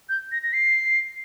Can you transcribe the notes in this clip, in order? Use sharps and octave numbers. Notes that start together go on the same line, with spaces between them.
G6
A#6
A#6
C7